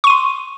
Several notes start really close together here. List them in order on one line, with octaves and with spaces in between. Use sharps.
C#6 D#7 C6